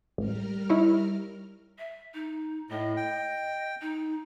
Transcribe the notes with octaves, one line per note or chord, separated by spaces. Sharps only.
A1 G3 A#4 F6
D#4 E4 C#5
E5
D#4
A2 D#5
G5
D#4